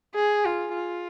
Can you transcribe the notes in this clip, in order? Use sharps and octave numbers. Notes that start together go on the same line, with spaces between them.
G#4
F4
F4